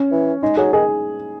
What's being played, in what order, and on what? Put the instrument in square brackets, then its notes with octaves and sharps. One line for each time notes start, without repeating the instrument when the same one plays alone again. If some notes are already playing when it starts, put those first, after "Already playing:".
Already playing: [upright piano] C#4
[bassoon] E3
[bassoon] G#3 [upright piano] D#4
[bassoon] F#3 [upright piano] G#4
[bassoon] D#3 [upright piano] G#4